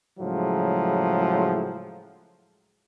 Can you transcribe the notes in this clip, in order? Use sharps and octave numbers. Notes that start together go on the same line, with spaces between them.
A2 C#3 F3 F#3 G#3